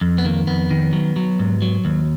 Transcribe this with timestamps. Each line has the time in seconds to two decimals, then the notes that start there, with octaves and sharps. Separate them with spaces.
0.01 F2
0.18 B3
0.25 D#3 A#3
0.47 F2 B3
0.71 D#3
0.93 F#3
1.16 F#3
1.39 G#2
1.62 F#3
1.85 D#2